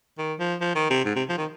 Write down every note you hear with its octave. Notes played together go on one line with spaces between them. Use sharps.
D#3
F3
F3
D#3
C3
G#2
C3
F3
D#3